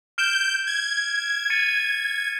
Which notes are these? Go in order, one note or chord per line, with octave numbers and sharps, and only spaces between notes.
F6 G6 D7 E7
G#6
A6 C#7 D#7